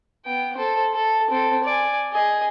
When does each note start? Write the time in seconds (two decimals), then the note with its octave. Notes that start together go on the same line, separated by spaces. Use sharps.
0.25 B3 G5
0.56 A4 C5
0.93 A4
1.30 C4 A4
1.64 D5 G#5
2.12 G#4 D#5